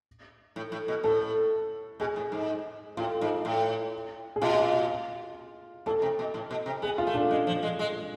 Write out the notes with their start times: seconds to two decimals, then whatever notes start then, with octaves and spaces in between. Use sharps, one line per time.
0.56 A2
0.72 A2
0.88 B2
1.03 A2 A4
2.00 B2 G#4
2.16 A2
2.32 G#2
2.97 A2 F4
3.21 G#2
3.45 A2
4.36 G#4
4.42 B2 F4
5.86 A2 A4
6.02 C3
6.19 B2
6.34 A2
6.51 B2
6.66 C3
6.82 B3 G#4
6.98 F4
7.07 A3
7.15 D4
7.31 G#3
7.47 F3
7.63 G#3
7.79 G#3